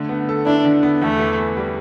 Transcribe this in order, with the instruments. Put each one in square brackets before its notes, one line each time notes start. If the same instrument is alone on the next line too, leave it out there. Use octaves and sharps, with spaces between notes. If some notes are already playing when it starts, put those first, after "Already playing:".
Already playing: [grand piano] D3 A3
B3
A4
[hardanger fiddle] D4 [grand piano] E4
[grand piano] D3
B3
[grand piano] E2 [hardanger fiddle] A3
[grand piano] E3
B3
G3